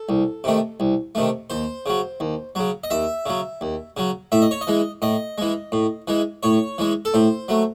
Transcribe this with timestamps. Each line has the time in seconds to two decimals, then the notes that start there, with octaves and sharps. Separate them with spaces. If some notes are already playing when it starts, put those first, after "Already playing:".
Already playing: A4
0.09 C2
0.44 C3 D#3 A3
0.80 C2
1.15 C3 D#3 A3
1.50 D#2 C5
1.86 C#3 F#3
2.20 D#2
2.55 C#3 F#3
2.84 D#5
2.90 D#2 E5
3.26 C#3 F#3
3.61 D#2
3.97 C#3 F#3
4.32 A2 E5
4.42 D#5
4.51 C#5
4.61 D#5
4.67 E3 G#3
5.02 A2 D#5
5.38 E3 G#3
5.72 A2
6.08 E3 G#3
6.43 A2 C#5
6.78 E3 G#3
7.05 A4
7.14 A2 C5
7.48 F#3 A3